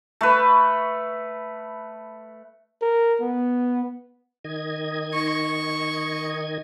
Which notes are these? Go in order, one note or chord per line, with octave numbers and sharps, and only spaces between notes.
A3 B4
A#4
B3
D#3 D#5 G#6
D#4 C#6